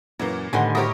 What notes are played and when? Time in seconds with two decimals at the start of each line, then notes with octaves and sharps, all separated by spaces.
0.20 F#2 A#2 E3 A#3
0.53 A2 D3 D#3 G3 B3 F#5 G#5 C6
0.75 E4 F#4 G4 A#4 C5 C#5 D#5